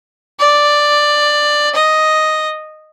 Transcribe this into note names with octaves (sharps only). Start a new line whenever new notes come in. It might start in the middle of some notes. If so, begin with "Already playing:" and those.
D5
D#5